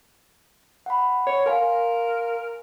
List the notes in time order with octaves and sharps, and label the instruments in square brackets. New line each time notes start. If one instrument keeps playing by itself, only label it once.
[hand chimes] F#5 B5
[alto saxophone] C#5
[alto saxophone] A#4 [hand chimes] F5 G#5 C6